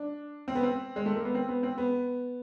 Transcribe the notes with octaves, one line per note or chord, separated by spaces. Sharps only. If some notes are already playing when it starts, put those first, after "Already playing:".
Already playing: D4
C4
B3
C4
G#3
A3
A#3
B3
C4
B3
C4
B3